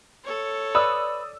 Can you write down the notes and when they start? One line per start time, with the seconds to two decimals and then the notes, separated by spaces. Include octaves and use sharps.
0.23 A4 C#5
0.75 B4 D5 D#6 E6